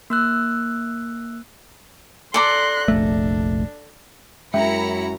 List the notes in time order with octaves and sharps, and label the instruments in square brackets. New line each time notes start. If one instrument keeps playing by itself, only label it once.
[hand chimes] A#3 E6 F#6
[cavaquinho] A4 D5 A#5 [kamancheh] C6 F#6
[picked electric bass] F1 A#1 A3 [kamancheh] D4
[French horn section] F#2 [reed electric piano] G#3 G5 [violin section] E4 A#5 C#7 [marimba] E5